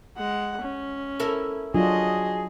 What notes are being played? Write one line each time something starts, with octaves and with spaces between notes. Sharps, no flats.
G#3 F#5
C#4
E4 A4 A#4
F#3 D4 F4 F#4 G#4 D#5